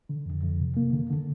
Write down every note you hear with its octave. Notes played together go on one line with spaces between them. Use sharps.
D3
F2
F2
C3
A#3
D3
D3